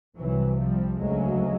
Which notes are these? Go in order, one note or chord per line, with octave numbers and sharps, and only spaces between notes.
C2 C3 E3 F#3
F3 G3
D2 C#3 F#3 G#3